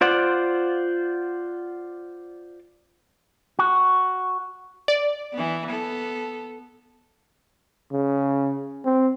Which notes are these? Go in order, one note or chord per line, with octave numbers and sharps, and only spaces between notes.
F4 C5 D5 F#5
F#4
D5
E3 B3
B3 A4
C#3
C4